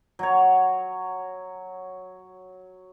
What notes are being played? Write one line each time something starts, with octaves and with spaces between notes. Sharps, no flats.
F#3 C#5